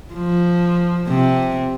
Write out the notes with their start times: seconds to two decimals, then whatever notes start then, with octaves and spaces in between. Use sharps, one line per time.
0.14 F3
1.07 C3